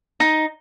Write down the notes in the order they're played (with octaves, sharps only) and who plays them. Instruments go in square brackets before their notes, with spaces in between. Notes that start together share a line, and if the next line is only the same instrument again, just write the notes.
[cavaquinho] D#4